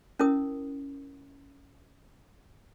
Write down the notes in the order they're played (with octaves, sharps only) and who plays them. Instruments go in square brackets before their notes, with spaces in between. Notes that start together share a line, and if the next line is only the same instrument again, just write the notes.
[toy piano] C#4 E4 A#4 D#6